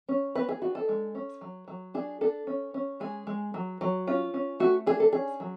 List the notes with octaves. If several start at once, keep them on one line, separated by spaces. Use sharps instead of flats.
C#4
B3 B4
G#4
D4 F#4
A4
G#3
C#4
F#3
F#3
D4 G#4
D4 A4
C#4
C#4
G#3 G#4
G#3
F#3
F#3
C#4 F4
C#4
A3 F#4
D4 G#4
A4
C#4 G#4
F#3